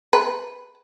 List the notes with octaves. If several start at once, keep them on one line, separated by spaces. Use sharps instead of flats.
B4